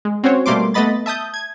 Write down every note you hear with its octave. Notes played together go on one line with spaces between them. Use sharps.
G#3
C4 C#4 F#4 C5 C#5
B2 G3 A3 A#3 C6 D6
A3 B3 D#5 B5 A6
E5 A5 D#6 G6
G#6